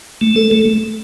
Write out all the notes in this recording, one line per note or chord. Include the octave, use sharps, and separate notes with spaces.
A3
A4
A3